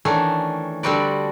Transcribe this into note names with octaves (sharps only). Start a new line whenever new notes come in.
D#3 E3 A3 C#4 D4
D3 G3 C4 F#4 B4 D5